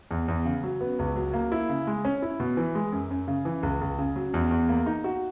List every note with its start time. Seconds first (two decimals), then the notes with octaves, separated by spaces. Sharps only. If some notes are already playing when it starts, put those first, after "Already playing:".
0.11 E2
0.28 E2
0.45 C#3
0.64 F#3
0.81 B3
0.99 C#2
1.16 F#3
1.34 A#3
1.52 E4
1.69 C#3
1.87 G#3
2.05 C#4
2.22 E4
2.40 B2
2.57 E3
2.75 G#3
2.92 F#2
3.11 F#2
3.28 C#3
3.45 E3
3.63 C#2
3.81 C#2
3.99 C#3
4.16 F#3
4.34 E2
4.51 E2
4.69 A#3
4.86 D#4
5.04 F#4